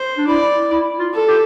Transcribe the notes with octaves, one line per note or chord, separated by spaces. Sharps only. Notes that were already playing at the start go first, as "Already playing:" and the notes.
Already playing: C5
D4
E4 D5
E4
F4
A4
G4